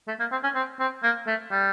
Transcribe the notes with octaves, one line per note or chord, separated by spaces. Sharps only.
A3
A#3
C4
C#4
C4
C4
A#3
A3
G3